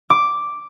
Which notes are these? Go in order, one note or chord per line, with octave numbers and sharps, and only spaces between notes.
D6